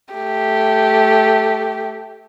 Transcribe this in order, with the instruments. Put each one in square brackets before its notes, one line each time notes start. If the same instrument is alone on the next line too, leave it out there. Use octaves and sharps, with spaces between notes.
[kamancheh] A3 G4